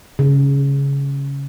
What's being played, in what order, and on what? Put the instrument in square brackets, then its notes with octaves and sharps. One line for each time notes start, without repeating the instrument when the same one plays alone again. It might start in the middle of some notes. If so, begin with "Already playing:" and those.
[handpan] C#3